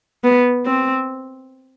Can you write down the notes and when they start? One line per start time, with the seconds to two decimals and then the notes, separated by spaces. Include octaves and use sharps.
0.24 B3
0.66 C4